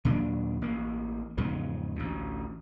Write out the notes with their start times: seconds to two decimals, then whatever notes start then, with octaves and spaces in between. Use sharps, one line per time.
0.05 D#2 A#2 F#3 D4
0.62 A1 A#3
1.37 E2 G#2 C#3 F3
1.96 A1 D2